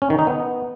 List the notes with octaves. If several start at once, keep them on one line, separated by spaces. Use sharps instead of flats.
C#4
D#3
D#4
B3